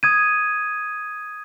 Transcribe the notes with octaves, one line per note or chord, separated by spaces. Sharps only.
D#6 G#6 D#7